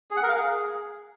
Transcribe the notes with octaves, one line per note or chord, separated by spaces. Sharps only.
G#4
F#5
A#4
F5
G#4